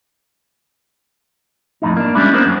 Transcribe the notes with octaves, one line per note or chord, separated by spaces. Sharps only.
F2 A2 D#4
A#3 D4
G3 G#3 C#4 D4 E4
A#3 B3 D4 A#4 C5
F#2